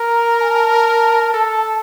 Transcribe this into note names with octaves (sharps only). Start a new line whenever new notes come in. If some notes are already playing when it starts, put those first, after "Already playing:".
Already playing: A#4 A#5
G#5
A5
A4